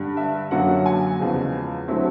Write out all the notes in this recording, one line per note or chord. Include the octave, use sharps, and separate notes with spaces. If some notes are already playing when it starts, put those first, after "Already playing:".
Already playing: G2 D3 G3
E5
F#2 D3 F#3 A#3 C#4 F#5
G#5
E2 C#3 F3 G#3
D3 F#3 A3 C4 E4